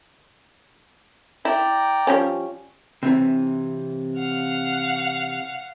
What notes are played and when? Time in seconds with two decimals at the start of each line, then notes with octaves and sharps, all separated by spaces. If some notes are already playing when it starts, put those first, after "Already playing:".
1.45 E4 D5 G5 A#5
2.07 F3 G3 C#4
3.03 C3 E3
4.19 F5 F#5